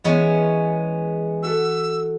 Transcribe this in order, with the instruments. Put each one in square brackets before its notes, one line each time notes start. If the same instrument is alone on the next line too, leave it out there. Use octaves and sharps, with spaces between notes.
[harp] E3 [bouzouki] G#3 B3 C#4
[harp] F#4 A4 [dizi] E6